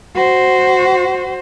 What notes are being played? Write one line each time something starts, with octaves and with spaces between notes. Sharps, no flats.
F#4 C5